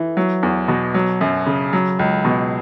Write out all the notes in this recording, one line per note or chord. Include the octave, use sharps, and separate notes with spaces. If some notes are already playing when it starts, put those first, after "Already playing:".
Already playing: E3
F#3
E2
B2
F#3
F#2
C#3
F#3
C#2
B2